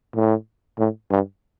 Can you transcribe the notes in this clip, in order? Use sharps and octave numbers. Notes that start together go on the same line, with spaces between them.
A2
A2
G2